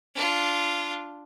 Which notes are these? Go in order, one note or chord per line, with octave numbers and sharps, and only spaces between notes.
D4 F4